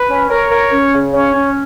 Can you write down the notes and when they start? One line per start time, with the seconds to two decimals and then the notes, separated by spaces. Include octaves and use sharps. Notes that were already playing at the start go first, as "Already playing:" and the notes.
Already playing: B4
0.09 C#4
0.30 A#4 C#5
0.50 A#4
0.71 C#4
0.93 C#3
1.13 C#4 C#5
1.34 C#4